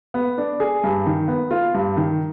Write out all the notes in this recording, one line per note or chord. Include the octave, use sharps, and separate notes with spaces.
B3
D4
G#4
G2
D#3
B3
F4
G2
D#3